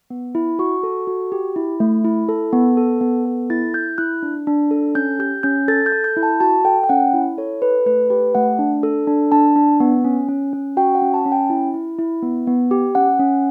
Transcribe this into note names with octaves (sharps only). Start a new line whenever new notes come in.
B3
E4
F#4 C#6
A4
F#4
G4
E4
A3
E4
A4
B3
A4
B3
A4
E4 A6
E4 G6
E4 F#6
D4
D4
A4
C#4 G6
G4 G6
C#4 G6
A4 A6
G6
A4
G6
E4
A5
F#4 A5
A4 G5
G5
C#4 F#5
E4
A4 C#5
A4 B4
A3 B4
G4 B4
A3 F#5
D4
A4
D4
D4 A5
D4
B3
C#4
C#4
C#4
F#4 G5
F#5
C#4
A5
C#4
G5
E4
E4
E4
B3
B3
G4
C#4 F#5
C#4